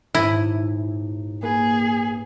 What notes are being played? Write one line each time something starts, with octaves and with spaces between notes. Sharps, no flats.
D#1 G#2 E4 D#7
A#3 G#4 B4